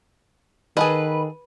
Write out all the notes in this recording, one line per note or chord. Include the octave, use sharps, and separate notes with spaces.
D#3 G#4 A4 B4 D#5